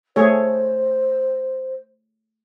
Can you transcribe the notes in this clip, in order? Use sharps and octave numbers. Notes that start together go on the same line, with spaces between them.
A3 G#4 C5 C#5